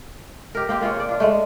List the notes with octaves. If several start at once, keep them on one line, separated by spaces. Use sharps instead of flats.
G4 A#4
A#3 C4 G4
A#3 F4 G#4 C#5
C#3 D5
D4 F4
G#3 A3